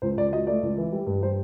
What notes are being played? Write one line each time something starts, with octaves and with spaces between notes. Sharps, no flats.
C#2 C5
C#2 D5
F#3 D#5
A3 D5
C#2
E3
G3
G2
G3 C5